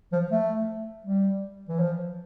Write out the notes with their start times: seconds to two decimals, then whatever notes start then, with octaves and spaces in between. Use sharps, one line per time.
0.12 F3
0.31 A3
1.05 G3
1.69 E3
1.79 F3